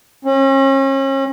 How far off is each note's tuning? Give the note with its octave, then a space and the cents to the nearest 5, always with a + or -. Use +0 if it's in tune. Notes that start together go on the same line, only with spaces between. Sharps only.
C#4 -40